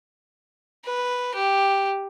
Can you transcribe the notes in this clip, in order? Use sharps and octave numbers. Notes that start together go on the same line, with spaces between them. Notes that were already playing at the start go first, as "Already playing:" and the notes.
B4
G4